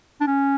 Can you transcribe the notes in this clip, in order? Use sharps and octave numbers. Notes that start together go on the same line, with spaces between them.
D4
C#4